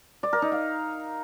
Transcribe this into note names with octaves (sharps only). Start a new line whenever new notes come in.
D5
A#4
D#4
F5